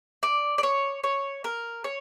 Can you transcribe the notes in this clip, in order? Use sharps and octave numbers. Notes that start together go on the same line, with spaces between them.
D5
D5
C#5
C#5
A#4
C#5